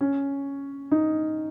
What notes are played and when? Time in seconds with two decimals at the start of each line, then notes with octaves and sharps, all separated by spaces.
0.01 C#4
0.91 D#4